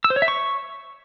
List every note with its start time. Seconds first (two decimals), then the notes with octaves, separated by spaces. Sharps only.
0.04 E6
0.10 C5
0.16 C#5
0.22 E5
0.28 C#6